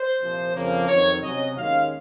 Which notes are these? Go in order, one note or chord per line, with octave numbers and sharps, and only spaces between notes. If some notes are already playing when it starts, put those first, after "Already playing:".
Already playing: C5
C2 A#2 F3
F2 C#3 F3 A#3
F2 D#3 F#3 C4 D#4 C#5
C3 F#3 C#4 D#5
D#2 D#3 G#3 C#4 F5